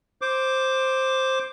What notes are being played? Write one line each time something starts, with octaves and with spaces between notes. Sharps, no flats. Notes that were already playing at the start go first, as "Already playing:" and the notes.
C5 D6